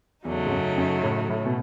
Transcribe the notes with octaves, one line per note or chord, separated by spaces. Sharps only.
E2 C#3 F#3 A3 D#4
G#2
F#2
F#2
A2
A2
B2